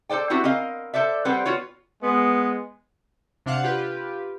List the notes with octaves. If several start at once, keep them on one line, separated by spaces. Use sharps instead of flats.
A4 A#4 C5 D5 G5
B3 C4 E4 F#4 G4
C4 A#4 D#5 F5
A4 C5 D5 E5
G3 C4 B4 C5 F#5
B3 F4 F#4 C#5
G#3 B3
C3 D4 F5 F#5 C7
F4 G4 B4